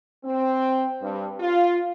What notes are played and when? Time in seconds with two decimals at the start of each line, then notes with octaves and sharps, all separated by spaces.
0.25 C4
1.02 G2
1.40 F4